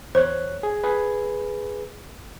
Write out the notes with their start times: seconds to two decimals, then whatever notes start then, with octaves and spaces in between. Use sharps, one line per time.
0.15 E2 C5 C#5 F#6
0.63 G#4
0.84 G#4 B4